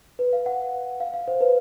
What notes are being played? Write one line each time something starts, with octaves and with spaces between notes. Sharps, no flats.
B4
F5
F#5
F5
F5
C5
B4